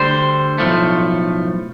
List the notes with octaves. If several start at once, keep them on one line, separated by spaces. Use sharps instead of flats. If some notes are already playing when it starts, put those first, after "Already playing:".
Already playing: D2 D3 G3 C5
B1 A2 F3 A3